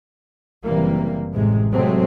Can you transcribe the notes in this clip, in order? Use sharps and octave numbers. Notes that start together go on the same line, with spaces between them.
F#1 C3 E3 G3 A#3
A1 C3 G#3
C3 F#3 G#3 A3 C4